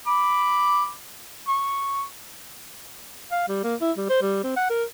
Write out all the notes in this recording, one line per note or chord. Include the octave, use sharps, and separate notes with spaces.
B5 D6
C#6
F5
G3
A#3
E4
G3
C5
G3
C4
F#5
A#4